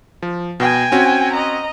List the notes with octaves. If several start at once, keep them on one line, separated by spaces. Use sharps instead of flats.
F3
B2 G5 G#5
C4 C#4 F#4
D#5 A#5